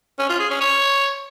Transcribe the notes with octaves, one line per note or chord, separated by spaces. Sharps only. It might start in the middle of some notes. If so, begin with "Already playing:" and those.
C#4
F4
G#4
C#4
C#5